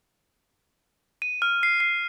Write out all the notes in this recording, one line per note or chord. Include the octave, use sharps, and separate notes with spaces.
D#7
F6
C7
C7